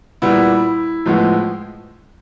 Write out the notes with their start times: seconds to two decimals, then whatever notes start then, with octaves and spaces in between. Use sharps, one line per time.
0.22 A#2 G3 B3 E4
1.06 A2 F3 G#3 B3